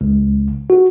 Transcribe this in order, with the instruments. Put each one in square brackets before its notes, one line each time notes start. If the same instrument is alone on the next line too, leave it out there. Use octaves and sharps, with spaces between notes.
[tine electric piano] C#2
F#4